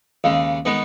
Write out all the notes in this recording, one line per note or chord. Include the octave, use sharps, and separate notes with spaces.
D#2 C#3 G#3
D#3 G#3 B3